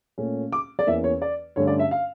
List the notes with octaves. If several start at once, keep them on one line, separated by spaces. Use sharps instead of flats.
A#2 A3 C#4
D6
D5
E2 E3 A#3 C#4 E5
C#5
D5
G2 D3 A3 C#4 C#5
D5
E5
F5